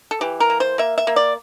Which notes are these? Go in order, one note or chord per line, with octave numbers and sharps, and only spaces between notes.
A4
E3 G4
A#4
A#3
C5
A#3 E5
E5
A#3
D5